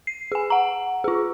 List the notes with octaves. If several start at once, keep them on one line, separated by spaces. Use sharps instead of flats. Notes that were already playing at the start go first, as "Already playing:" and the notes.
C7
G#4 G#5
F#5 A#5
F4 G#4